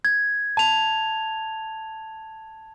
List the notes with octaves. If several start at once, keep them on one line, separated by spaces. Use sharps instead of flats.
G#6
A5 F7